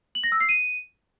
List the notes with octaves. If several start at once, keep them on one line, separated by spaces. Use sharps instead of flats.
F#7
A#6
E6
C7
D#7